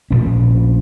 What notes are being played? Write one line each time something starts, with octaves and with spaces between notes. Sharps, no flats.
A#1 A#2 C#4